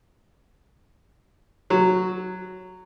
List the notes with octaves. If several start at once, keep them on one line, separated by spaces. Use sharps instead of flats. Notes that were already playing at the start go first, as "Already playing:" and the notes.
F#3